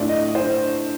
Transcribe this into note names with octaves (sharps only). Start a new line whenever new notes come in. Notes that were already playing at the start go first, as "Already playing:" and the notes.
Already playing: A2 A3 D4 F4 D5
D#5
C5